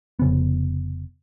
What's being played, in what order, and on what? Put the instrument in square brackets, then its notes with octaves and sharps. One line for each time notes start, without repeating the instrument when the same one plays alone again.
[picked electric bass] F1 C#3 B3